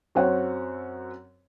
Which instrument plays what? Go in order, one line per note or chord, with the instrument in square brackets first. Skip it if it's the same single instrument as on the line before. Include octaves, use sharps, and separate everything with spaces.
[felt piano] F#2 C4 C5 C#5 F#5